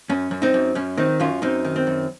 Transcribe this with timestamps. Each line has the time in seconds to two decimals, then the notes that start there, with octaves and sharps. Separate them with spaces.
0.09 F#2 C#4
0.31 F#2
0.42 C4 D#4
0.54 F#2
0.75 F#2 C#4
0.97 D#3 C4 D#4
1.20 F#2 C#4 F4
1.42 F#2 C4 D#4
1.65 D#3
1.76 C4
1.87 F#2